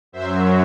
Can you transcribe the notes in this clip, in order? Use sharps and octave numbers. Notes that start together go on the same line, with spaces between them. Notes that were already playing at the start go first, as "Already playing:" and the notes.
F#2 F#3 C5 E5